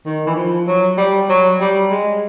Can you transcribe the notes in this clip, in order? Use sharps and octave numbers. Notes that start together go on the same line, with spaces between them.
D#3
E3
F3
F#3
G3
F#3
G3
G#3